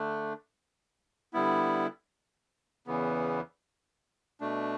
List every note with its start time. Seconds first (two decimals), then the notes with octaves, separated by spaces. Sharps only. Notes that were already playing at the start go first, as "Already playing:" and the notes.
Already playing: D3 A3 D4
1.33 D3 G3 B3 E4
2.87 E2 C#3 E3 B3
4.41 B2 A3 D4